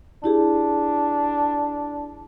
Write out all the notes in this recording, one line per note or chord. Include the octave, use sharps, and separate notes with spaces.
D4 E4 G4 G#4